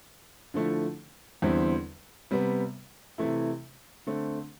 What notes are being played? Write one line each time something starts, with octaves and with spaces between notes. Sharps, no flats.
D3 F3 A3 E4
E2 D3 G3 C4 E4
C3 G3 B3
C3 E3 A3 E4
D3 A3 C4